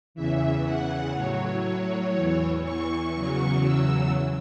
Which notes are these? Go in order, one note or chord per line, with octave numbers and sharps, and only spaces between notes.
E2 C#3 E3 E5
F#5
A2 F#3 C#5
E2 E3
C#6
E2 C#3 F#3 C#6
E6